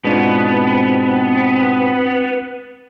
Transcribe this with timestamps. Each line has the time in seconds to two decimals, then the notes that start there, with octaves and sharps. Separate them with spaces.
0.05 G#2 B2 G#3 B3 C4 D4 F4